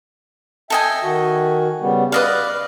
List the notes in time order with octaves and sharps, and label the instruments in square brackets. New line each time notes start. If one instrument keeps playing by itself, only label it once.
[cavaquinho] A4 D#5 G#5 [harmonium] E5 G5
[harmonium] D#3 F#4
C#3 G3 B3
[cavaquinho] B4 D#5 F5 [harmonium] D5